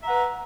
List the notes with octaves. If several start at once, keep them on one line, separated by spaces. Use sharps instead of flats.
B4 E5 F#5 A#5